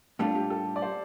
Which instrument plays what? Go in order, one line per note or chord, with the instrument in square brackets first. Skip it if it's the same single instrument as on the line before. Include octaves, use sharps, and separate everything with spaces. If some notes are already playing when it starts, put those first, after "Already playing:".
[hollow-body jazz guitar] A2 G3 D4 F4 [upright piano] A4
[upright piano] G4
A4
D5
C5